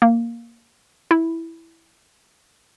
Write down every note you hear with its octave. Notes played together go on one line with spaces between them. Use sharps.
A#3
E4